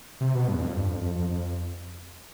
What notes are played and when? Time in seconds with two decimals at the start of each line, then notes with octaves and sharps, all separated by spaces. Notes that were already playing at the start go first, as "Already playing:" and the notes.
0.21 C3
0.35 B2
0.48 G2
0.55 E2
0.61 F2
0.75 G2
0.88 F2
1.01 F2
1.15 F2
1.29 F2